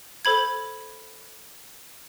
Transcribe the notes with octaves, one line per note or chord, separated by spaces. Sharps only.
A4 C5 B5 G#6